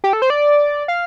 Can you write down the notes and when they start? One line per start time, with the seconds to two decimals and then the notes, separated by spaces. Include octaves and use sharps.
0.04 G4
0.13 A4
0.22 C5
0.30 D5
0.88 F5